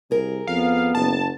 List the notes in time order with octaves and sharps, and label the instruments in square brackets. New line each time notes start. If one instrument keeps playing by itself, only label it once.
[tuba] C2 [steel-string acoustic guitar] G#4 A#4
[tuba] F2 [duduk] B3 [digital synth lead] F5
[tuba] F#1 [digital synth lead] A5